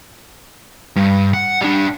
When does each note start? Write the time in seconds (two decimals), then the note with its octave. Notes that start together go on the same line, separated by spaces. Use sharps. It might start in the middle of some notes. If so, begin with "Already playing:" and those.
0.96 G2
1.34 F#5
1.62 G3 D4